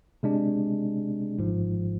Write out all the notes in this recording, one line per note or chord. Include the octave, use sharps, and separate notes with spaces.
C3 G#3 D4
G#1 G#2 F3